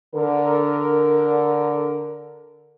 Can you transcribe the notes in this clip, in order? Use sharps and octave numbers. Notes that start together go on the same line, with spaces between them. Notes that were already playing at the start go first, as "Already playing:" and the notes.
D3 A#4